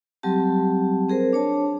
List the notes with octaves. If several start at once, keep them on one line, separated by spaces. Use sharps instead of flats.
F#3 G3 C4 G4 A5
C4 G#4 A#4 C5
D4 C#5 A5